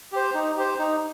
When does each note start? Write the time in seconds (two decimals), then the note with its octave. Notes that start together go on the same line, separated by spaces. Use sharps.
0.12 G4 C5
0.34 D#4
0.57 G4 C5
0.79 D#4